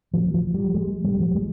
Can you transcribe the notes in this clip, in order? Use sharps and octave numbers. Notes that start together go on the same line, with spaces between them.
F3
F3
G3
G#3
G3
F3
G#3